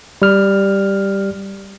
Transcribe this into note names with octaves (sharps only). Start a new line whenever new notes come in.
G3 F6